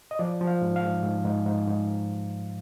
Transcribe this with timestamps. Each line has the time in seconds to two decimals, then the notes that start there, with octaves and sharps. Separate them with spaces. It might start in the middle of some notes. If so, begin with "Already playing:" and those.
0.11 D#5
0.19 F3 D5
0.41 F3
0.47 F5
0.62 G#2
0.76 F5
0.83 G#2
1.03 G#2
1.25 G#2
1.46 G#2
1.67 G#2